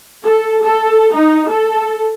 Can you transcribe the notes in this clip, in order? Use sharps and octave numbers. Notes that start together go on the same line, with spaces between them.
A4
A4
D#4
A4